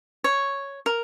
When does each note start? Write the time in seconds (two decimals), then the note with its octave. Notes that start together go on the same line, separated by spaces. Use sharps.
0.24 C#5
0.86 A#4